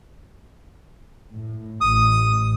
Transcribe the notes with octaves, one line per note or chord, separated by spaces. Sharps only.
A2
A1 D#6